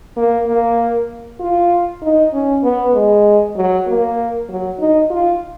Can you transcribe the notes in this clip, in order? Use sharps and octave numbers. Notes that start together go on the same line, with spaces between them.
A#3
A#3
F4
D#4
C#4
B3
G#3
F#3
A#3
F#3
D#4
F4